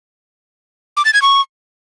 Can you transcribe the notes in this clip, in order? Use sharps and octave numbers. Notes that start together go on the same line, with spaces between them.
D6
A6
G#6
C#6